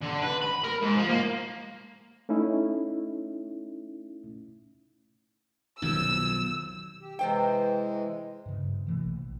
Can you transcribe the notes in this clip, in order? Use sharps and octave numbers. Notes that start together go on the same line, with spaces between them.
D3
B4
B5
A#4
G#2
F3
A#3
A3 C#4 D#4 E4
B1 F2 D#3 E6
G4
C3 E3 G#3 C5 G5
G2 C#3
C3 E3 A3
A#1